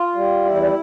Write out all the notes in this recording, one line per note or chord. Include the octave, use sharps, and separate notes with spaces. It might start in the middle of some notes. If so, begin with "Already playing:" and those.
Already playing: F4
G3
E2 E4